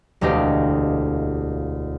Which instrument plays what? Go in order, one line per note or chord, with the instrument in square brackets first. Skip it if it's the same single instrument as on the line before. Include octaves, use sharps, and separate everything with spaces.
[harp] E1 D2 G4 D#5 F5